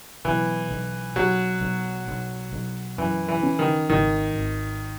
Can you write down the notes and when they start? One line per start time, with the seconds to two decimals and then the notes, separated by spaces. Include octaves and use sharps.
0.25 B1 E3
0.71 B1
1.16 B1 F#3
1.61 B1
2.08 B1
2.53 B1
2.98 F#2 E3
3.28 E3
3.43 C#4
3.59 D#3
3.89 G#1 D#3
4.35 G#1